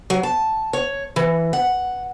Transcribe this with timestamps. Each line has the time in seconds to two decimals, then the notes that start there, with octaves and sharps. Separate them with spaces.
0.10 F#3
0.23 A5
0.73 C#5
1.16 E3
1.53 F#5